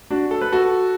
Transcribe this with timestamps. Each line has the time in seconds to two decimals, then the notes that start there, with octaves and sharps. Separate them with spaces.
0.10 D4 F#4
0.31 A4
0.41 B4
0.52 F#4 A4